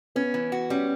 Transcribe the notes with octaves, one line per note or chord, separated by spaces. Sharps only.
B3 C#4
E3
F#4
G3 C#4